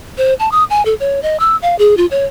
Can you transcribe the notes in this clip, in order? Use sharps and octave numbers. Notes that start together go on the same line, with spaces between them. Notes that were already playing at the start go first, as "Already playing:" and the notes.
C5
A5
D#6
G#5
A4
C#5
D#5
E6
F5
G#4
F4
C#5